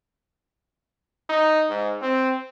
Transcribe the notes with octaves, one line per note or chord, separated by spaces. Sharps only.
D#4
G#2
C4